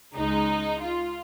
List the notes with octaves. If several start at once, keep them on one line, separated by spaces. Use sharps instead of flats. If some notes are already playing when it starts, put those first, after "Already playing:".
C#2 C#3 G#3 D#4
F4